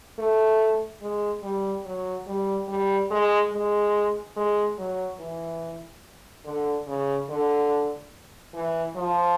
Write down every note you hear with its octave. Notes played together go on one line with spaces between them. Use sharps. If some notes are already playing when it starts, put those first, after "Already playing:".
A3
G#3
G3
F#3
G3
G3
G#3
G#3
G#3
F#3
E3
D3
C#3
D3
E3
F3